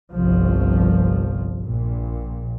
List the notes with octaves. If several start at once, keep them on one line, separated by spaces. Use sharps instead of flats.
G1 C2 F3
A#1 A#2